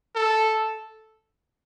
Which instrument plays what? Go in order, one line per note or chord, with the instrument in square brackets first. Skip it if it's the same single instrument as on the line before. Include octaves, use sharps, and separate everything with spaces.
[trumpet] A4